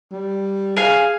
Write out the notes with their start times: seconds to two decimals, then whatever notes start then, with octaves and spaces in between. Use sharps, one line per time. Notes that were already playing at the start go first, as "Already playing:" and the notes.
0.12 G3
0.77 G#4 F5 G#5